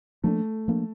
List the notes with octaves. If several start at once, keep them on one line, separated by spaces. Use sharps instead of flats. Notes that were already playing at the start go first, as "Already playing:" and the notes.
F3 A3 A#3 D4
F3 A#3 D4